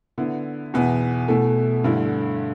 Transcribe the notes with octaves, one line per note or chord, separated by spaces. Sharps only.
D3 B3 E4
E2 B2 B3 E4
B2 A3 E4
G2 D3 A3 E4